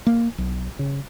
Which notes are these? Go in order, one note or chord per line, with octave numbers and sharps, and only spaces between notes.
A#3
B1
C#3